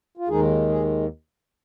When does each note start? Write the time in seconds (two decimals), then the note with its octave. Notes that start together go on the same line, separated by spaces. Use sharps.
0.17 F4
0.28 D#2 D#3 G#3 D#4 G#4
0.69 G#4